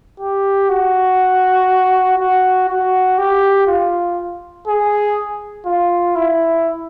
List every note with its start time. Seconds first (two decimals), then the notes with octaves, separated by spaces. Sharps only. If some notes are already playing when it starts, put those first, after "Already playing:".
0.20 G4
0.69 F#4
2.18 F#4
2.68 F#4
3.18 G4
3.67 F4
4.67 G#4
5.66 F4
6.15 E4